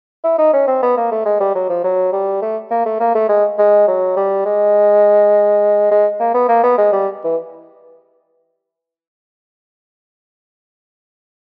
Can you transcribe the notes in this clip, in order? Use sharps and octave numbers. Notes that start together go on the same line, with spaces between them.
E4
D#4
C#4
C4
B3
A#3
A3
G#3
G3
F#3
F3
F#3
G3
A3
A#3
A3
A#3
A3
G#3
G#3
F#3
G3
G#3
G#3
A#3
B3
A#3
B3
G#3
G3
E3